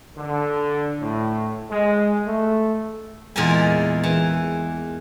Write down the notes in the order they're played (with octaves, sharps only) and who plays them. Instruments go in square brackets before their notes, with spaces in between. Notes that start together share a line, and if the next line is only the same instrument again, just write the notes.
[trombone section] D3
A2
G#3
A3
[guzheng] E2 A#2 G#3 A#4 G#5
E3